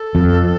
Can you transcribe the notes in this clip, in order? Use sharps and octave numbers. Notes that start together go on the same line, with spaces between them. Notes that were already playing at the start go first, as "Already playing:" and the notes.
Already playing: A4
F2